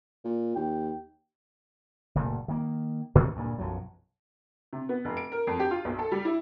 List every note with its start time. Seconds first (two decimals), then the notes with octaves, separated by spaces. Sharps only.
0.24 A#2
0.56 D#2 G5
2.15 F#1 A#2 A3
2.48 D#3 A#3
3.15 A2 D#3 A3 C#4
3.36 D2 G2 A#2
3.58 B1 F#2 F3 F#3
4.73 C3
4.89 B3
5.05 F1
5.17 D7
5.32 A#4
5.47 F2
5.60 G4
5.71 F4
5.85 B1
5.99 A4
6.12 G3
6.25 E4